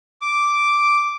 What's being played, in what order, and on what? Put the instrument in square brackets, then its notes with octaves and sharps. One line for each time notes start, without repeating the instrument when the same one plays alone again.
[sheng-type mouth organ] D6